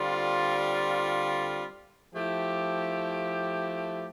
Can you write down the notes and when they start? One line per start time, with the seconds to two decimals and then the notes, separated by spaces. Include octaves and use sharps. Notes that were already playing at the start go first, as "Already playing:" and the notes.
Already playing: D3 G3 C4 F4
2.15 F3 A3 E4 G4